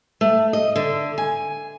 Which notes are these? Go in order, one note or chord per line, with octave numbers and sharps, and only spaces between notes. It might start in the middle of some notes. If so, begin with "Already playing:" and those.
A3
D#5
D3
G#5